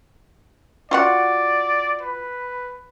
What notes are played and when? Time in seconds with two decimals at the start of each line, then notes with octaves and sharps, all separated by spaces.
0.91 F4 F#4 D5 F#5
2.01 B4